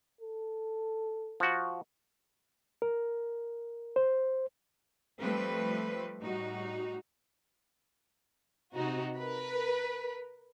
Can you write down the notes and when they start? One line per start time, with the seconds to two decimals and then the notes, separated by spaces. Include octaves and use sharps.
0.21 A4
1.40 F3 F#4
2.82 A#4
3.96 C5
5.19 F3 G3 A3 C4 B4
6.21 A2 G3 D#4 F#4
8.74 C3 D#4 F#4
9.16 A#4 B4